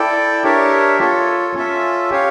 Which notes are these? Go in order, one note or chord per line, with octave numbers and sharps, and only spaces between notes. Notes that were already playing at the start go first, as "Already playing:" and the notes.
Already playing: E4 A4 D5 G5
D4 G4 A#4 C#5 E5
F4 A4 C#5
C#4 F4 A4 E5
G4 C#5 F5